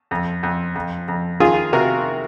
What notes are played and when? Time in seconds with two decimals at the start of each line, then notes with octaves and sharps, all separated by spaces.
0.11 F2
0.43 F2
0.76 F2
1.08 F2
1.40 D#3 F4 G#4
1.73 C3 F#4 A#4